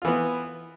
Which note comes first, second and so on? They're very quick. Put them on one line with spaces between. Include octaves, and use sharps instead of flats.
F4 E3 B3